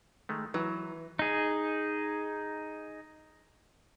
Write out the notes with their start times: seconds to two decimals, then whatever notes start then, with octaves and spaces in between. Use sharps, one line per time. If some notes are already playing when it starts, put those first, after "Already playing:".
0.29 D#3 G#3 A3
0.54 E3 F#3
1.19 D#4 G#4